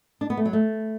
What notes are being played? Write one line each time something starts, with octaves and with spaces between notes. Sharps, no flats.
D4
B3
A3
F#3
A3